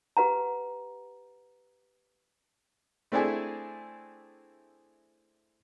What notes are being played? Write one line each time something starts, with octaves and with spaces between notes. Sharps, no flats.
G4 B4 F#5 A#5
A3 C4 D4 E4 G#4